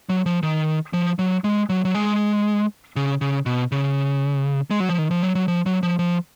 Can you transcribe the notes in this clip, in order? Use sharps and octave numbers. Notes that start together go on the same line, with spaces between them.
F#3
F3
D#3
F3
F#3
G#3
F#3
F#3
G#3
C#3
C#3
B2
C#3
G#3
F#3
F3
D#3
F3
F#3
F#3
F3
F#3
F3
F3